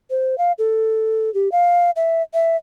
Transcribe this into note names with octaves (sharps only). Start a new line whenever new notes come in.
C5
F5
A4
G4
F5
E5
E5